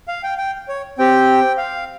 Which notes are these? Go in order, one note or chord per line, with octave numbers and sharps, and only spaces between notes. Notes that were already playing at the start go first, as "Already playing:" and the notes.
F5
G5
G5
C#5
C4 G4 G5
F5